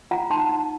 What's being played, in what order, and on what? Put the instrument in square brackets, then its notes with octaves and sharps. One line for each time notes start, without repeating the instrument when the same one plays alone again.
[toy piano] F4 F#5 A#5
D#4 A5 C6
D#4